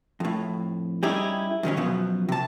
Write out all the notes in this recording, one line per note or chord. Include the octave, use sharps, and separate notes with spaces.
F2 A2
G3 C#4 D#4 E4 G4 G#4
F#2 D#3 F#3 C#4
F#2 B2 F3 B3
C3 A5